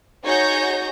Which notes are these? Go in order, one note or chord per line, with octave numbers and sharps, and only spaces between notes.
D#4 F#4 G#4 C#5 G6 A#6